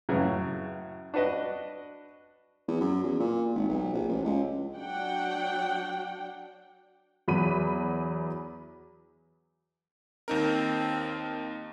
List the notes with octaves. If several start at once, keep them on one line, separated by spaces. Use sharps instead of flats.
F#2 A2 C#3 E3 F#3
D4 F#4 B4 D#5
E2
F#2
E2
A#2
G#1
B1
A#1
A1
C#2
F#3 D4 F#5 G5
E2 F#3 B5 D#7
D#2 C4 D#4 A#4